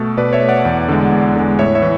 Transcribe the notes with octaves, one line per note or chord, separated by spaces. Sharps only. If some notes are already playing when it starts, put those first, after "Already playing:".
Already playing: B2 A3 A4
B2 B4 D5
C#5 E5
A3
D5 F#5
E2
D3 G#3
E2
D3 G#3
A2 C#5 E5
C#5 E5
E3